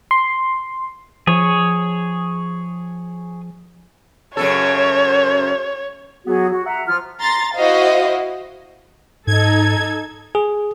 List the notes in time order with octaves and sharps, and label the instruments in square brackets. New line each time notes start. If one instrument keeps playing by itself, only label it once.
[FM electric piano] C6
[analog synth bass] F3 [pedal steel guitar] G#4 C#5
[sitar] F#2 C#3 A4 [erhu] C#5
[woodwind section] F#3 B3 F#4 G#4
F#4
E5 F#5 A#5
F3 F4 F6
[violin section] A#5 C6 A6
E4 F#4 C5 D#5 F5
[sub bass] G#2 [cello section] D#4 A4 [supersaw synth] G#6
[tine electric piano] G#4